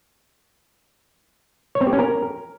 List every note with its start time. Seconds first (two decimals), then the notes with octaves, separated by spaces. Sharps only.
1.75 C#5
1.81 C4
1.87 G4
1.93 C#4
1.99 A#4